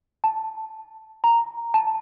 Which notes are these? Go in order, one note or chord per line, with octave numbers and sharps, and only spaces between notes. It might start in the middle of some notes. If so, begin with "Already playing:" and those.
A5
A#5
A5